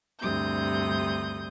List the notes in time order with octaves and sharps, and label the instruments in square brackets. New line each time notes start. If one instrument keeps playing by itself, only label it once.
[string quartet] D2 G2 C3 D#6 G6